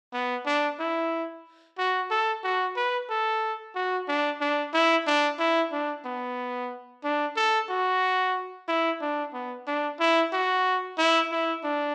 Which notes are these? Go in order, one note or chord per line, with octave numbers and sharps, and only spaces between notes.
B3
D4
E4
F#4
A4
F#4
B4
A4
F#4
D4
D4
E4
D4
E4
D4
B3
D4
A4
F#4
E4
D4
B3
D4
E4
F#4
E4
E4
D4